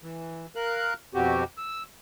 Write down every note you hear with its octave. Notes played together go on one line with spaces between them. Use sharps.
E3
A#4 F5 F#6
F2 B2 C4 F#4 G4
E6